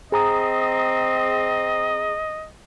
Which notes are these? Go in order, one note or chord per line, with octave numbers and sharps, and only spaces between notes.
C4 G#4 D#5 A#5 D#6